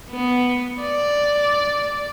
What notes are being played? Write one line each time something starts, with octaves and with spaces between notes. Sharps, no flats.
B3
D5